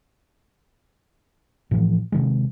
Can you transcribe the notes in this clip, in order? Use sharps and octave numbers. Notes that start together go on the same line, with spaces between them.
A2 E3 F3
C3 D#3 G#3